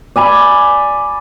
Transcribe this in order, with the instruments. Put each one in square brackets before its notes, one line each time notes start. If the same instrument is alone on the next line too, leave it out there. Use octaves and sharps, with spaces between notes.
[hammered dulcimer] D5 G#5 B5